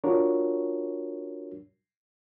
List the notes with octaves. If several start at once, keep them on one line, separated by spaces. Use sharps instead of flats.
D4 F4 F#4 A#4 C#5